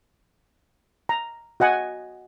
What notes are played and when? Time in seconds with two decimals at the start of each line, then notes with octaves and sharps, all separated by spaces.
1.09 A#5
1.60 F#4 D#5 F#5 G#5